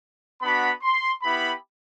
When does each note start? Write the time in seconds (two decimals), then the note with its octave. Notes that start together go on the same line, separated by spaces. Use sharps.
0.42 B3 D4 F#4 B5
0.82 C6
1.23 B3 E4 G4 B5